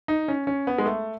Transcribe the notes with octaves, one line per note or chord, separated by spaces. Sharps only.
D#4
C#4
C#4
B3
G#3
A3